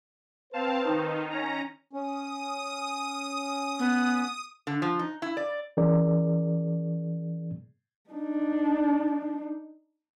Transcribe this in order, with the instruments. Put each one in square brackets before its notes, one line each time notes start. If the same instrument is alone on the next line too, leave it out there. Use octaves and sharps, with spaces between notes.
[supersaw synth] C4 F5 A5 [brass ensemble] B4 C5
[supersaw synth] D#3 D#4
C#4 A#5
[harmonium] C#4 [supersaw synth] D#6
[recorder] B3
[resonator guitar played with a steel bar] D3
F3
D#4
E4
D5
[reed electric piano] E3 C#4 G#4 A#4 D5
[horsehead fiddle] D4 D#4